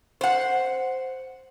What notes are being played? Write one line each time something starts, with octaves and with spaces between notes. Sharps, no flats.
C5 F#5